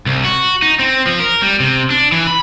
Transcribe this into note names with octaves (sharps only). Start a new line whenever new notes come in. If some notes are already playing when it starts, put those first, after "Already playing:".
C2
F#4
D#4
C4
F3
A#4
G3
C3
D4
E3
B5